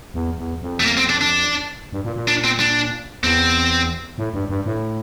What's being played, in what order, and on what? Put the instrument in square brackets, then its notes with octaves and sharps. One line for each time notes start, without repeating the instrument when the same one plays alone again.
[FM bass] E2
E2
F2
[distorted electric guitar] A3
A#3
C4
D4
D4
[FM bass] G2
A#2
A#2
[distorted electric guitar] D4
C4
D4
[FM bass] E2 [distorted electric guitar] C4
[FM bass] A2
G2
G2
A2